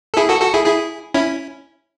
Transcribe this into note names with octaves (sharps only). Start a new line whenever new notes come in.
A4
E4 G#4
F#4 A4
F#4 A4
E4 G#4
E4 G#4
C#4 E4